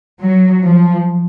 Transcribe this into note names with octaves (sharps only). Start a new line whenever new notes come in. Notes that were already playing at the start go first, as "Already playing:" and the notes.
F#3
F3